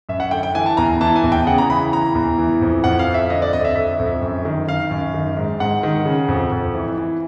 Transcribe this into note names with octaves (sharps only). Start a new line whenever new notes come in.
F#2 E5
F#5
D3 G5
G5
E3 G#5
A5
E2 A#5
E3 A5
G#5
E2
G5
C#3 F#5
A#5
E3 B5
E3 A#5
E2
E3
F2
F2 F#5
F5
F2
E5
D3 D#5
D5
F2 D#5
E5
D3 E5
F2
F#2
D#3
D#3 F5
F#2
D#3
G#2
G#2 F#5
D#3
C#3
F2
F2
E3
E3